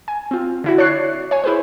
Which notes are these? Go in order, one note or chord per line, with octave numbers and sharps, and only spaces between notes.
G#5
C4 F4
D3 E4 F#4
C#5 D5 A5 C#6 F#6 C7
C#5 G#5
E4 G#4 B4 C5